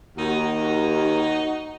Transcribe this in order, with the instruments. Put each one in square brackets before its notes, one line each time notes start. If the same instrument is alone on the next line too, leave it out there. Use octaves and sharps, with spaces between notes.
[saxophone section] D#2 [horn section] D#4 F#4